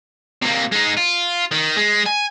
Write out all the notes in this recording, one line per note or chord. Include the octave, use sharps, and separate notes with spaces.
C3 A#3
G#3 D#4
F4
D#3
G#3
G#5